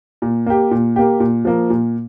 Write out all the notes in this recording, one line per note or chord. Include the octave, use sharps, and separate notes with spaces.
A#2
A#3 G4
A#2
A#3 G4
A#2
F3 A#3
A#2